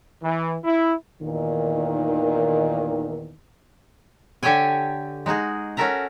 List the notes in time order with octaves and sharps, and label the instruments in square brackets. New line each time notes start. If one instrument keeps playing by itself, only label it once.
[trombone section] E3
E4
[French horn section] E2 A#2 D#3
[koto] D3 G4 A4 C#5 G5 G#5
G#3 D#4 F#4 G#4
C#4 F#4 A4 A#4 E5 A#5